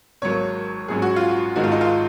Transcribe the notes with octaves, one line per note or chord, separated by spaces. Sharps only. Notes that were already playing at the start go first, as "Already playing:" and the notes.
G#1 G#2 F#3 A#3 C#5
A#1 G#2 F#3 C#4 G#4
F#4
F4
F#4
G#1 G#2 D#3 G#3 F#4
F4
D#4
F4